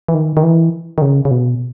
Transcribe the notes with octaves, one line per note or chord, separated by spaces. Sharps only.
E3
D#3
D#3
E3
D#3
C#3
C#3
B2